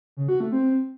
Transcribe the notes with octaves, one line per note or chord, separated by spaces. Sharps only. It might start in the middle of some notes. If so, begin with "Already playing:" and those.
C#3
F#4
A3
C4